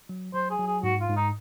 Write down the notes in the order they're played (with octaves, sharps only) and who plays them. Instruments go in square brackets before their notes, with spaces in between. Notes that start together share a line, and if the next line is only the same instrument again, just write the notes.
[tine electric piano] F#3
[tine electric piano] F#3 [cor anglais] C5
[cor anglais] G#4
[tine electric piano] F#3
[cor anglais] G#4
[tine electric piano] G#2 [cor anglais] F#4
[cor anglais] F4
[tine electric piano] G#2
[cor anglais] D#4